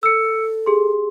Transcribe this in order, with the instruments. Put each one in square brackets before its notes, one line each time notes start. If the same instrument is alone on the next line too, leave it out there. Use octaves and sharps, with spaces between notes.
[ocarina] A4 [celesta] E6 C#7
[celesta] G4 G#4 C6